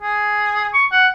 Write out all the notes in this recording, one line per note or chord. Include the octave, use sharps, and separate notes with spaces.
G#4
C#6
F#5